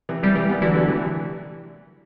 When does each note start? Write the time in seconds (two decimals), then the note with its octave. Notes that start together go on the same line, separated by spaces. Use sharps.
0.09 C3 E3
0.23 C3 E3 G3
0.35 E3 G3
0.49 G3 B3
0.62 D3 E3 F#3
0.75 D3 F#3
0.88 C3 E3